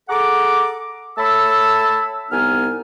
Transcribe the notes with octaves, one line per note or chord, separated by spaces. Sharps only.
G#4 A4 F#5 A#5 D6
A3 C#5 A5 B5 E6
C2 B3 D#4 G#5 F6